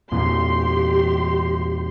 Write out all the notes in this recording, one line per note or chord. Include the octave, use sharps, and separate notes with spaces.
E2 A#2 E3 G4 C6